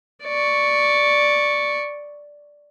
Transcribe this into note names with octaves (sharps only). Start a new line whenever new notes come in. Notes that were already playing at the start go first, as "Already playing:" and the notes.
D5 C#6